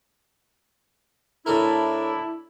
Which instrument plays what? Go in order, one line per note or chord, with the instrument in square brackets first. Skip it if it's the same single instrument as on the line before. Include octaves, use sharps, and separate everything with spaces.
[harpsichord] A2 A4 A#4 [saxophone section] D4 E4